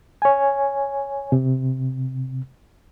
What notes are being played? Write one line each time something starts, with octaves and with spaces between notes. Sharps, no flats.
C#5 G#5
C3